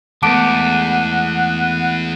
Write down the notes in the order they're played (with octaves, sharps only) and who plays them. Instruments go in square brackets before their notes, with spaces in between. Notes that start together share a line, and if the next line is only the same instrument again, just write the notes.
[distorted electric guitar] E2 [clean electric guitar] G#3 A3 B3 [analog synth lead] F#5 [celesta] A5 D6 D7